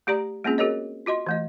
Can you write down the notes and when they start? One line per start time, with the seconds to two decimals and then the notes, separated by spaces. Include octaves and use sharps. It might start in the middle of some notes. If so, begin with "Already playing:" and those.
0.07 A3 G4 D5 A#5
0.44 G#3 A#3 C4 C#4 F4 G#4
0.58 F#4 G#4 A#4 C#5 D#5
1.06 F4 F#4 D#5 C6
1.26 E3 A3 D#5